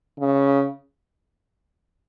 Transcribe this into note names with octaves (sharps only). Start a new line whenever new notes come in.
C#3